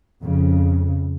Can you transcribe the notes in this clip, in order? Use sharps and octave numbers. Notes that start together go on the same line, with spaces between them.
F2 C#3